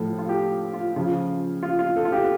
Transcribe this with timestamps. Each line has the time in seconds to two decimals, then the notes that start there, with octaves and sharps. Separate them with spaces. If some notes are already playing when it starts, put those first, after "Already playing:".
Already playing: A2 F3 A4
0.18 F4
0.29 G4
0.73 F4
0.96 C#3 F3 F4
1.63 F4
1.79 F4
1.96 A4
2.05 F4
2.12 G4